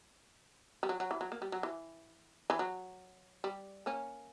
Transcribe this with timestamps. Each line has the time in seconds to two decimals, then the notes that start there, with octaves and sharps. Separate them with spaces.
0.83 G3
0.89 F#3
1.00 F#3
1.11 E3
1.21 F#3
1.32 A#3
1.42 G3
1.52 F#3
1.63 E3
2.50 E3
2.59 F#3
3.44 G3
3.86 A#3 C#4